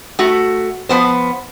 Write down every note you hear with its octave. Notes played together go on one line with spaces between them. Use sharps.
A3 F#4
F3 B3 C5